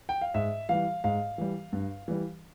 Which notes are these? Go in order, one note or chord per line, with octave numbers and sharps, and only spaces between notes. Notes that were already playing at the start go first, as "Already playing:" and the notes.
G5
F5
G#2 E5
E3 G3 F5
G#2 F5
E3 G3
G2
E3 G3